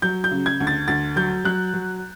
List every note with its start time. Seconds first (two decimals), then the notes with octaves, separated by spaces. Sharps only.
0.02 F#3 G6
0.24 G6
0.31 C#3
0.46 G#6
0.60 D2
0.67 A6
0.88 D2 A6
1.16 F#3 G6
1.45 F#3 F#6
1.74 F#3